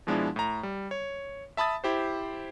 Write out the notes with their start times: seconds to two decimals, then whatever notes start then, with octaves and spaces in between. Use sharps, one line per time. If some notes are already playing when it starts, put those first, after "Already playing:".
0.07 B2 F3 G#3 B3 D4 E4
0.36 A2 A#5
0.63 G3
0.91 C#5
1.57 E5 A5 B5 D#6 A6
1.84 E4 G4 C5